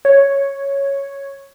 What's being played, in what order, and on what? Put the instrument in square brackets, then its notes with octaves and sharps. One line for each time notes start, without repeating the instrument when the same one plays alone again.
[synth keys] C#5